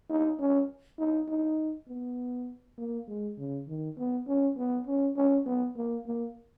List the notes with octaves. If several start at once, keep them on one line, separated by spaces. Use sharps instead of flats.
D#4
C#4
D#4
D#4
B3
A#3
G#3
C#3
D#3
B3
C#4
B3
C#4
C#4
B3
A#3
A#3